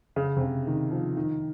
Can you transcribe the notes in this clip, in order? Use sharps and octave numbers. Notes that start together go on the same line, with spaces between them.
C#3
C3
C#3
D#3
F3
D#3